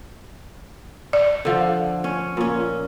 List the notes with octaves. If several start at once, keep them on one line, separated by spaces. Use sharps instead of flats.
D5
D3 F3
C#4
A#2 C#4